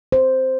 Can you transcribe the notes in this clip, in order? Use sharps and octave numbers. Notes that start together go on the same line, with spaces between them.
C5